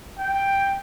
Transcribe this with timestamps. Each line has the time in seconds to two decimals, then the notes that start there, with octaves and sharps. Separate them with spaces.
0.18 G5